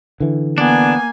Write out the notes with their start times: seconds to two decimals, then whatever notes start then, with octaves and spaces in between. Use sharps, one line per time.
0.20 D3 E3
0.58 A#3 B3 D4 G#5